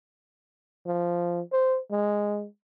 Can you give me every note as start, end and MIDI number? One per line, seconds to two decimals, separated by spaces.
0.86 1.40 53
1.52 1.79 72
1.91 2.46 56